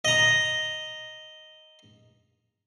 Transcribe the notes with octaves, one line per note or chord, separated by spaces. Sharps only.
D#5 A#5